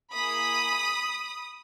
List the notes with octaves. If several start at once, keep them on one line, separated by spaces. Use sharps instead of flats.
A#3 E4 G#4 B5 D#6